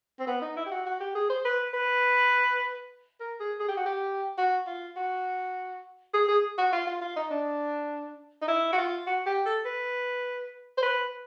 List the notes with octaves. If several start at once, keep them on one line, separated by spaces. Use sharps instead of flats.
C4
B3
D#4
E4
G4
F#4
F#4
G4
G#4
C5
B4
B4
A#4
G#4
G#4
G4
F#4
G4
F#4
F4
F#4
G#4
G#4
F#4
F4
F4
F4
D#4
D4
D#4
E4
F#4
F4
F#4
G4
A4
B4
C5
B4